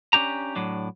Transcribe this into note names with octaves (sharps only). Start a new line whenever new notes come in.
C#4 D4 G4 A#5
A2 F#3 D4